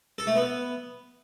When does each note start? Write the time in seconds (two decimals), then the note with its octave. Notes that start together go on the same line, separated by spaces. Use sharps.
0.18 A4
0.27 A3
0.36 B3